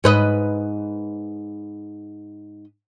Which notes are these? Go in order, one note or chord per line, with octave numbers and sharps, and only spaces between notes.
G#2 B4 D#5